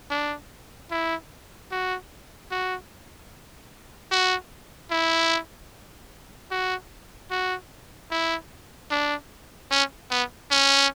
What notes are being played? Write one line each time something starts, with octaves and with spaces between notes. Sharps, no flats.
D4
E4
F#4
F#4
F#4
E4
F#4
F#4
E4
D4
C#4
B3
C#4